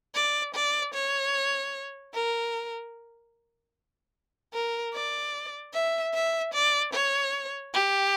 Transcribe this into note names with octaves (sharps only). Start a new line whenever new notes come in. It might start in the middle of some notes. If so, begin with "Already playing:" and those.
D5
D5
C#5
A#4
A#4
D5
E5
E5
D5
C#5
G4